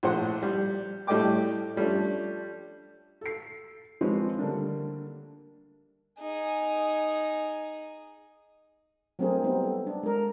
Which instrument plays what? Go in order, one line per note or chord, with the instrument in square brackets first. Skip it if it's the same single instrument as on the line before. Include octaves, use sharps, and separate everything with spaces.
[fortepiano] A#1 A2 F3 C5 F#5 C6
G3
A2 G3 A3 D#5 G5 D6
F3 G3 A3 C#4 D4
[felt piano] A4 C7
D#3 F3 G#3 C4 B4 C#5
D3 G3 A3 A#3 D4
[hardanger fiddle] D#4 G#4
[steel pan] F#3 A3 C4 D4 G#4 A#4
F#3 G3 B3 C4 D#4
A4
D4
G#3 A#4